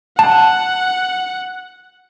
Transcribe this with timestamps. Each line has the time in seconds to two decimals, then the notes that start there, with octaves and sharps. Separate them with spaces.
0.19 F#5 A5